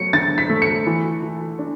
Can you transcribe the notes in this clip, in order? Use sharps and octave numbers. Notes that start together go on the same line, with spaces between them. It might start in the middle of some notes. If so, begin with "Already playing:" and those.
Already playing: F#3 A3 C#7
D3 A6
B6
A3
C#7
E3
E3
D4